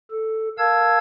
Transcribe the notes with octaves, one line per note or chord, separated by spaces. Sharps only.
A4
A#4 F5 A5 E6 G#6